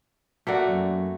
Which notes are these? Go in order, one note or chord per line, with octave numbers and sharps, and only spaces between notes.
A3 A#3 F#4 D5 B6
F#2